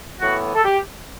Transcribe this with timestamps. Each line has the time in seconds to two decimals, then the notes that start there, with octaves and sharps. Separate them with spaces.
0.20 A2 E3 B3 F#4
0.55 A4
0.64 G4